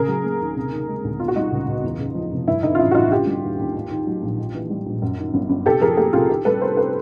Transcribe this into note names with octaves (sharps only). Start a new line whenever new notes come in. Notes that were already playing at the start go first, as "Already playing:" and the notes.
Already playing: C#3 G#4 A#4
F#3
A#3
D#2
C3
D#3
G#3
D2
B2 F4
F#4
G3 D#4 F4
C#2
C#2
E2
C#3
F3
F1
G2 E4
D3 D#4
F4
A1 E4
F#4
A1 D#4 F4
D3 F4 G4
G3
D#2
D#2
G#2
D#3
F#3
A#1
G#2
E3
G3
A#1
F#2
D#3
G1
G1
C3 G4 A4
F3 G#4 A#4
A#3 G4 A4
C2 F4 G4
D#3 G4 A4
G3 A4 B4
B3 A#4 C5
A4 B4